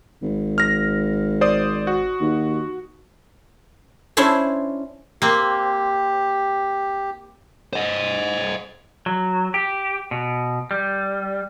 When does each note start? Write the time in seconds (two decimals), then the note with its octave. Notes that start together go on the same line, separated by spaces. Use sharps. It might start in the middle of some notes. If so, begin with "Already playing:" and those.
0.22 G#1
0.58 F6 A#6
1.41 C5 D5 D#6
1.87 F#4
2.20 D#2
4.17 C#4 D4 E4 C5 C#5
5.22 A#3 C4 G4
7.73 C5 D#5
9.06 F#3
9.54 G4
10.11 B2
10.71 G3